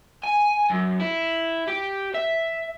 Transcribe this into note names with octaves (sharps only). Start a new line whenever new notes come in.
G#5
F#2
E4
G4
E5